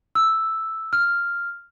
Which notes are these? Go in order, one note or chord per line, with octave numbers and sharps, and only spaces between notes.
E6
F6